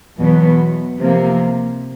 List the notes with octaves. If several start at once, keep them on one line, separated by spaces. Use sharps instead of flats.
E2 B2 F#3 B3
C3 F3 A#3